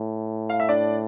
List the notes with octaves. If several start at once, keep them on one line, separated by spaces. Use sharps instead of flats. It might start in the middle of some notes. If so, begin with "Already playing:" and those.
Already playing: A2
F5
E5
D4 D5